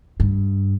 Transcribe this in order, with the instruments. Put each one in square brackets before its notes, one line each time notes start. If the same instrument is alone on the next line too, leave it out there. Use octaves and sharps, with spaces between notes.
[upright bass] G2